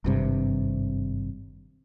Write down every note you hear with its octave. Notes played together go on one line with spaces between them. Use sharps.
G#1 G2 C3